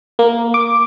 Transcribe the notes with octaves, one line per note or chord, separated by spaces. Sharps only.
A#3
D6